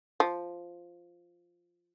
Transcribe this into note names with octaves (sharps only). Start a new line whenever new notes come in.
F3